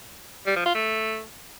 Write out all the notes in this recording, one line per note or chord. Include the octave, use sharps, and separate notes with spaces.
G3
F3
F4
A3